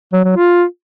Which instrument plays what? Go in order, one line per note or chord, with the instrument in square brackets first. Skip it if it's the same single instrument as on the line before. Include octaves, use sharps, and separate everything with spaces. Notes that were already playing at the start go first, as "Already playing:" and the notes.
[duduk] F#3
F#3
F4